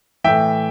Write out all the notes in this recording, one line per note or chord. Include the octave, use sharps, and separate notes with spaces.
A2 E3 E5 G5